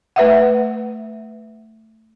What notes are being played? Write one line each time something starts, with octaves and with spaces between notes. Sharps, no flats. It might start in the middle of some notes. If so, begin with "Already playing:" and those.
A3 B4 E5 F#5